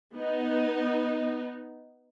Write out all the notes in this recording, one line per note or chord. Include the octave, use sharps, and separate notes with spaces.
B3 D#4